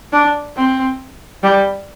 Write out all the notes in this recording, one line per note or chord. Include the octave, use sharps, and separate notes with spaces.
D4
C4
G3